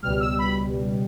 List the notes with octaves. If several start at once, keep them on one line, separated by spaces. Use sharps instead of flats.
C#2 B2 G3 F6
E6
B5